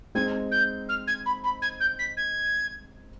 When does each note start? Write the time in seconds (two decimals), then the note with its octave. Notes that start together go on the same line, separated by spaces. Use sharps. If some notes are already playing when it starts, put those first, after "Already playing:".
0.15 G#3 C4 D#4 G#6
0.51 G6
0.89 F6
1.07 G#6
1.26 B5
1.44 B5
1.62 G#6
1.80 G6
1.99 B6
2.17 G#6